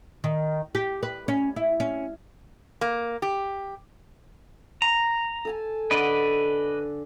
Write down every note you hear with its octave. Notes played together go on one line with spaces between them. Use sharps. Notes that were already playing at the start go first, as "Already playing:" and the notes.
D#3
G4
B4
C#4
E4
C#4
A#3
G4
A#5
A4 G#5 A5
D3 B4 D5 D#5